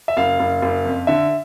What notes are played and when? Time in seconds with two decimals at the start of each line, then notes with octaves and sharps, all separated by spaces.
0.08 E5
0.17 F#1 F5
0.40 F#1
0.62 F#1
0.85 F2
1.07 D3 E5